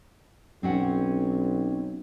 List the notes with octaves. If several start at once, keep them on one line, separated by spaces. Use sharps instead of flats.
B1 C4 C#4 F#5